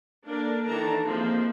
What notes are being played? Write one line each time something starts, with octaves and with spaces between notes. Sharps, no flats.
A#3 D4 A4 A#4 D5
D#3 E3 D4 A4 A5 A#5
F3 G#3 A#3 C4 F4